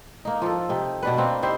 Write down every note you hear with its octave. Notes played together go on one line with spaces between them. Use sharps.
A#3 D#4
F3 A4
C3 D#4
B2 D4 B4
A#3 C4
D#4 E4 G4 C5